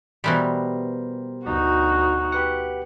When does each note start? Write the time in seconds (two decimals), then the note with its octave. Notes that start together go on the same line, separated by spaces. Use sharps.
0.24 B2 E3 G3 G4 A#4 C5
1.45 D2 D#4 F#4
2.32 G4 B4 F#5